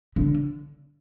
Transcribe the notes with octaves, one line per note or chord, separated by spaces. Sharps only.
D3